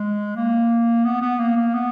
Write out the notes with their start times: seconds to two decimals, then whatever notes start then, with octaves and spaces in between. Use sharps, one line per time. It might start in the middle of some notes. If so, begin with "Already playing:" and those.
Already playing: G#3
0.36 A#3
1.05 B3
1.22 B3
1.39 A#3
1.57 A#3
1.74 B3